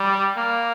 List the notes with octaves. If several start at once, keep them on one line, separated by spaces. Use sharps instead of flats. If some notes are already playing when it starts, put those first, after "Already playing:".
Already playing: G3
A#3